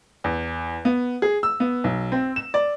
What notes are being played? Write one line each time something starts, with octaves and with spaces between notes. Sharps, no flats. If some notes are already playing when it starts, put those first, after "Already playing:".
E2
B3
G#4
E6
B3
B1
C4
E7
D5